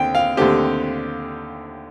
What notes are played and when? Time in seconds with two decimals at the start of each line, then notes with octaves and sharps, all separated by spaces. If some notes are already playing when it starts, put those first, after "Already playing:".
Already playing: D#2 D3 C4 G5
0.15 F5
0.37 D#2 D3 A3 C4 G4